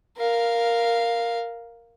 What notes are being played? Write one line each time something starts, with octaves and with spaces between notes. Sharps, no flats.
A#4 F5